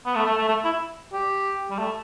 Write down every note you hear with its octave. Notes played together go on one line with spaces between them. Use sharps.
B3
A3
A3
A3
A3
E4
G4
G3
A3